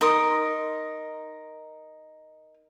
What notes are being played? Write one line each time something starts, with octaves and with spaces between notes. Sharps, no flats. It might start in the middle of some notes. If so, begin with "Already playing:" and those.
D#4 A#4 C6 D#6